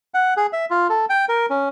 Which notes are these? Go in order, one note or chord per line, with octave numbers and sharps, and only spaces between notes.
F#5
G#4
E5
F4
A4
G5
A#4
C#4